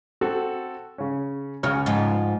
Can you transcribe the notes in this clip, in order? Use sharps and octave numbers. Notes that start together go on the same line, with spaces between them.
C4 F#4 A4
C#3 C#4
C#2 C#3 F#4 C#5 F6
G#2 F3